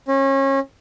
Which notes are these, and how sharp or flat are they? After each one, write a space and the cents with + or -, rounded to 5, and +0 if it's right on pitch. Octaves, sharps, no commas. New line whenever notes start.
C#4 -30